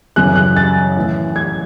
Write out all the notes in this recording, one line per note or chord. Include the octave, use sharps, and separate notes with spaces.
F#2 C#3 E3 F#6
F#6
A6
A2 E3
G#6